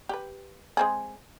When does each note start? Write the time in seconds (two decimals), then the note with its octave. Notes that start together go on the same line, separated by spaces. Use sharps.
0.09 G4 B4
0.77 G#3 C4 G#4